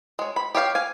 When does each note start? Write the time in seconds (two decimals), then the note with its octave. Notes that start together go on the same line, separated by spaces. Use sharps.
0.19 G#3 C#5
0.36 B5
0.55 G4 C#5 F5 G5
0.75 F5 G#5